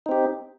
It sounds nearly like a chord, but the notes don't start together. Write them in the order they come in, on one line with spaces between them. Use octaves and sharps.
D#4 C4 G4